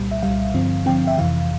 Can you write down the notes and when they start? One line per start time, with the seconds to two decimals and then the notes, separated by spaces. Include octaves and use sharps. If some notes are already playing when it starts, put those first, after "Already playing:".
Already playing: C2 A#2 G3
0.11 E5
0.22 C2 A#2 G3 F5
0.54 G2 D3 F3 C4
0.86 G2 D3 F3 C4 G5
1.07 E5
1.18 F2 C3 E3 F5